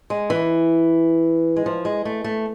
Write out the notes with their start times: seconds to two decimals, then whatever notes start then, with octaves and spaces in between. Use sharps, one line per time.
0.10 G#3
0.30 E3
1.56 G#3
1.66 F3
1.85 G#3
2.05 A3
2.24 A3